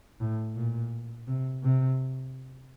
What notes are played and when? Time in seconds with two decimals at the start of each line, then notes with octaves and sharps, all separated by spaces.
0.20 A2
0.56 A#2
1.27 C3
1.63 C3